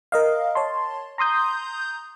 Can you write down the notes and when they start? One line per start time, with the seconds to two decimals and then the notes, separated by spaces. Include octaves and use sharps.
0.12 A#4 D#5 F5
0.55 C#5 A5 C6
1.18 A#5 C6 D#6 G6